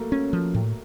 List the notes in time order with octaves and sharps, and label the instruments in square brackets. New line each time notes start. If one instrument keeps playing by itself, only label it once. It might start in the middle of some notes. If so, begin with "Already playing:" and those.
Already playing: [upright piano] F#3 A3 A#3
[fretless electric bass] C#4
F3
A2